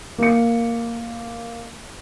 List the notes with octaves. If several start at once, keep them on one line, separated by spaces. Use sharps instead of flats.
A#3 C#7